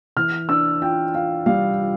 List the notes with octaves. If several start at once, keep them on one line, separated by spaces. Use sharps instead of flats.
E3 F6
D4 E6
F4 G5
F4 F5
G3 F5
F4